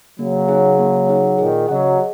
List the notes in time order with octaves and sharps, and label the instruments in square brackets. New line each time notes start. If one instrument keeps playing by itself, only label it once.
[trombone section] C#3 F#3 [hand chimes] A#3
[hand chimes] D#4 G#4 F#5
A#3
D#4 G#4 F#5
[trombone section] A#2 D#3 [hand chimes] G#4
[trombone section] C#3 F#3 [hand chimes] D#5 F#5
[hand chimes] G#4